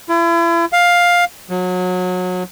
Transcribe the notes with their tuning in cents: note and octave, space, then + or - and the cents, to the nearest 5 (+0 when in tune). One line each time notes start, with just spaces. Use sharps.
E4 +40
F5 +10
F#3 -25